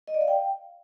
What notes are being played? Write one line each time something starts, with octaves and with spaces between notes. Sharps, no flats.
D#5
D5
F5
G5